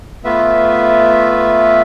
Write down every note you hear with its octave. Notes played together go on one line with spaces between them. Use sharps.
A3 B3 F4 B4 E5